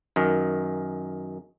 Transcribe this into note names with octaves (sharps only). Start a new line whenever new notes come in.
F#2 D#3